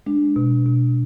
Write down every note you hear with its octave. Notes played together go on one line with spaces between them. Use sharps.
G#3 D4
B2
B2